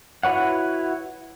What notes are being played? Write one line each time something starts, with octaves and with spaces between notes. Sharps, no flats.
E4 F#4 B4 C#5 F#5